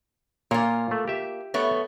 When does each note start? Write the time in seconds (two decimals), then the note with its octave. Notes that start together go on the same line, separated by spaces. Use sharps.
0.51 A#2 A#3 F4 C#5
0.91 A3
1.08 G4 E5
1.54 A3 B3 C#5